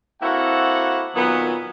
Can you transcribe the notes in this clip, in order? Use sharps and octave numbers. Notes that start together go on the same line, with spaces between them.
A#3 C4 E4 F#4 A4 F#5
A#2 D#3 F#3 B3